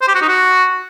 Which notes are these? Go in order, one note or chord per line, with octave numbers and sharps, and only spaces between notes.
C5
G4
F#4
D#4
F#4